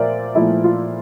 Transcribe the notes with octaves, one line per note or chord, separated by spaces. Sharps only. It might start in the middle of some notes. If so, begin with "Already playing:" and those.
Already playing: A#2 F3 A#4 C5 D5 E5
A#2 F3 A3 E4
F4